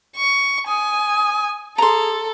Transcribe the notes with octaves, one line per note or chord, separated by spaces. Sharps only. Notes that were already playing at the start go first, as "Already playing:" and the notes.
C#6
G#5 D#6
G#4 A4 A#5 C6